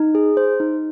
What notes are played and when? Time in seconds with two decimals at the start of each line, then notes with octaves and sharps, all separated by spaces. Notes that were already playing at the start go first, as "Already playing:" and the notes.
Already playing: D#4
0.15 G#4
0.37 C5
0.60 D#4